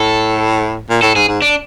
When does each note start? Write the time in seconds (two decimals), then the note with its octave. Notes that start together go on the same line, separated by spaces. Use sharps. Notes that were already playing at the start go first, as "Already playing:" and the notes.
Already playing: A2 A4
0.90 A#2
1.02 A2 A4
1.15 G#2 G#4
1.28 G#2
1.42 D4